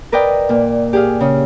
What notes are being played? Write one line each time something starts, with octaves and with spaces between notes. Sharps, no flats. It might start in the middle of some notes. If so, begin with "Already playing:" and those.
A#4 B4 D5 D#5 G5
A#2
G4 G#4 F5
C#3